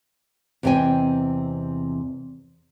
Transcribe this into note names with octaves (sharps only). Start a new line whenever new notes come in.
E2 C3 C4 D#5 G5 G#5